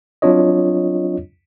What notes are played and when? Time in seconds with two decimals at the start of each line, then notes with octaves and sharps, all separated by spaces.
0.22 F#3 C4 D4 F4 C#5 D#5